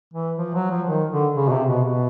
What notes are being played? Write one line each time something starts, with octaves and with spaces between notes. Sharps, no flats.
E3
F3
F#3
F3
D#3
D3
C#3
B2
C3
B2
B2